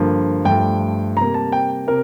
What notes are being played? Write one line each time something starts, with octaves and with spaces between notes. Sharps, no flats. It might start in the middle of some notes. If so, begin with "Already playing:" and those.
Already playing: G2 D3 F3 A#3
G2 F3 A3 G5
C3 G3 A#3 A#5
A5
G5
C3 A#4